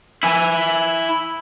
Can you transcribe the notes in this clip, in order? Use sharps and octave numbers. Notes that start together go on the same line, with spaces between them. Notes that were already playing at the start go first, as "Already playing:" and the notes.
E4 G#5